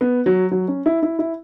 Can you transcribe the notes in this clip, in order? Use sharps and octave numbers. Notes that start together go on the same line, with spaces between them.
B3
F#3
F#3
C#4
E4
E4
E4